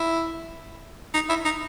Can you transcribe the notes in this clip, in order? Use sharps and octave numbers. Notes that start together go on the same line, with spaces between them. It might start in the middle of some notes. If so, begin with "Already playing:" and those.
Already playing: E4
D#4
E4
D#4